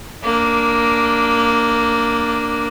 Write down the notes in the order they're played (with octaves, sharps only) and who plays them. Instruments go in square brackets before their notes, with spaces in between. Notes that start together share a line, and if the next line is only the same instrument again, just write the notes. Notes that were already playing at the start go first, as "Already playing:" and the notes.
[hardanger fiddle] A#3 D4